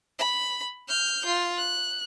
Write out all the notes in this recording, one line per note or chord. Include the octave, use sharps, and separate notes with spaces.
B5
F6 G6
F4
F#6